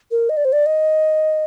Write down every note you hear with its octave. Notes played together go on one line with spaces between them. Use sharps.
A#4
D#5
D5
C5
D5
D#5